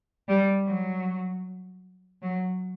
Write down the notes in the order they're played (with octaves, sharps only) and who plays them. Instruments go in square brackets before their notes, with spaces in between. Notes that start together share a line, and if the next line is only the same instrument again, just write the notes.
[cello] G3
F#3
F#3